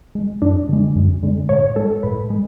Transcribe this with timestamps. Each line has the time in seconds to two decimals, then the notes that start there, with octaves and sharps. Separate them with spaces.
0.15 G#3
0.42 F#2 D4
0.69 D3 G#3
0.96 F#2
1.23 D3 G#3
1.49 A2 C#5
1.76 G#3 A4
2.03 A2 B4
2.30 G#3